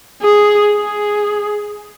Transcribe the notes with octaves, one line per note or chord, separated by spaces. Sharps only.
G#4
G#4